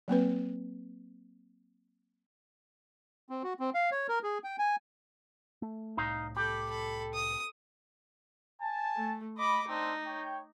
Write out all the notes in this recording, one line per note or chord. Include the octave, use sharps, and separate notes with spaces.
F#3 A#3 C4 B4
C4
F#4
C4
F5
C#5
A#4
G#4
G5
G#5
A3
C2 A2 D#4 F5
G4 A4 B5
A4 B5
D#6
G#5 A5
A3
D#5 B5 D6
C4 D4 D#4 C6
C#5 G5